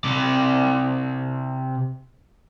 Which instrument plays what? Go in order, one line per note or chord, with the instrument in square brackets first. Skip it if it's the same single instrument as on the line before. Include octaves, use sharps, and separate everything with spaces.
[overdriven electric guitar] C3 D5